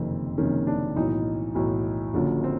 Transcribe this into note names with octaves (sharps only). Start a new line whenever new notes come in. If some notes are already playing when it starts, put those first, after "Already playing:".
Already playing: F#1 F2 C3 D#3 C4
F#1 F2 C3 D#3 C#4
D4
B1 A2 E3 D#4
B1 A2 E3
F#1 F#2 D3 F3
C4